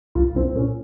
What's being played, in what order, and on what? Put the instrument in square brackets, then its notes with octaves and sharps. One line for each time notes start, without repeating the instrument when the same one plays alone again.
[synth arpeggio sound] C2 [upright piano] F4
[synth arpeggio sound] C2 [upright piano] C4
[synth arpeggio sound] A#2 [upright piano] C#4